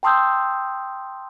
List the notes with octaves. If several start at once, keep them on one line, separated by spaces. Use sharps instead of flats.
G5 A5 C6 D#6 E6 G6